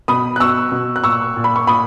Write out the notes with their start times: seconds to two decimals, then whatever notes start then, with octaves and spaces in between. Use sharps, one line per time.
0.08 B2 B5 D#6
0.36 F#6
0.40 B2 C#6 E6
0.72 B2
0.96 F#6
1.03 A#2 C#6 E6
1.36 A#2
1.44 B5
1.56 C#6
1.67 A#2 B5 D#6